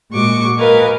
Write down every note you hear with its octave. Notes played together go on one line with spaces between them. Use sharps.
A#2 G#3 F#4 C#6 D6
A#4 B4 D#5 F5 G#5